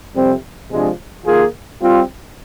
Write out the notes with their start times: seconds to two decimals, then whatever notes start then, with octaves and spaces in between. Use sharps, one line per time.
0.14 F2 C3 G3 C4
0.69 C3 F3 G#3 D4
1.25 D#3 A#3 F4 G#4
1.81 G3 C4 F4